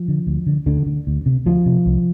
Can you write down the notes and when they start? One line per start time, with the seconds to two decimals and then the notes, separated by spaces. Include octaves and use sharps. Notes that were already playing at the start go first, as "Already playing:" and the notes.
Already playing: F3
0.08 D3
0.27 D2
0.47 D3
0.66 D2 D3
0.86 D3
1.07 D2
1.26 C3
1.46 D2 F3
1.66 C3
1.86 C2